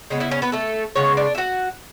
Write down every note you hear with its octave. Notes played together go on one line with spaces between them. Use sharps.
C#3 G#3 B3
E4 E5
C#4 C#5
B3 B4
A3 A4
C#3 G#3 B3 C#5
D4 D5
E5
F#4 F#5